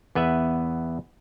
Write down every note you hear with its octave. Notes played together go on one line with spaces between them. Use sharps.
E2 B3 B4 E5